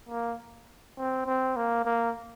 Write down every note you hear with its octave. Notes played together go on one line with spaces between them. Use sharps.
A#3
C4
C4
A#3
A#3